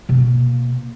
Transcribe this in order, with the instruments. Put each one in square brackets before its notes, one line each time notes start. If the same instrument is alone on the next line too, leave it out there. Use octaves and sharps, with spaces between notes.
[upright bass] B2 A#3